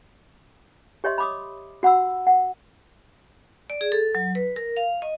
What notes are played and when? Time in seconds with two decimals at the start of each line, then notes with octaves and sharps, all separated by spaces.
1.04 G4 C#5 D#5 E5 C6
1.18 B5 D6 D#6
1.83 F#4 F#5 B5 E6
2.27 F#5
3.70 D5
3.81 G#4
3.92 A4
4.15 F#3
4.35 B4
4.56 A#4
4.77 F5
5.02 D#5